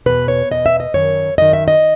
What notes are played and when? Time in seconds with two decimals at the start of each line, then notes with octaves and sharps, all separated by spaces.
0.06 E2 B2 B4
0.28 C#5
0.51 E2 B2 D#5
0.66 E5
0.80 D#5
0.94 F#2 D#3 C#5
1.38 F#2 D#3 D#5
1.53 E5
1.68 D#5